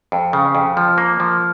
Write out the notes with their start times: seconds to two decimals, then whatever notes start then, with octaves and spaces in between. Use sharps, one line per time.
0.12 F2
0.33 C#3
0.55 F2
0.77 F3
0.98 A#3
1.20 F3